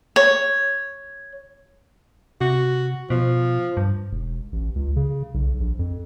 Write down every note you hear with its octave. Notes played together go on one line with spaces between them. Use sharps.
C#5
C3 F#4
B2 F3
G2
E1
A1
C#2
C#3
B1
A#1
F2